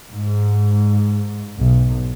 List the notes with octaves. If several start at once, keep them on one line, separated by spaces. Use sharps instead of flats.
G#2
B1